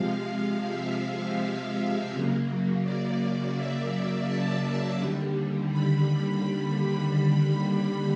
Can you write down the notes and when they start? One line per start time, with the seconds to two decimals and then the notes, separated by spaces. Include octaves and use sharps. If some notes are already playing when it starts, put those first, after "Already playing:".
Already playing: C3 F3 G#3 F5
0.69 E5
2.12 F#2 C#3 F#3 A#3
2.84 D5
3.56 E5
4.27 A5
4.99 D#2 D3 G3
5.71 B5
7.14 B5
7.50 B5